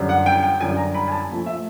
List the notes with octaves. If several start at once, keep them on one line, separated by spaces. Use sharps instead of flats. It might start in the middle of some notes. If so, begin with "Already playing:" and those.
Already playing: F#2 D3 G3
F#5
G5
G5
F#2 D3 G3 G#5
A#5
B5
G#5
A5
A#2 F3 A3
E5